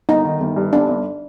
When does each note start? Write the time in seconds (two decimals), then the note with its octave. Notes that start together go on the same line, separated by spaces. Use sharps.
0.09 G1 D#4
0.25 D#3
0.40 G1
0.56 G2
0.73 G1 D4
0.89 G1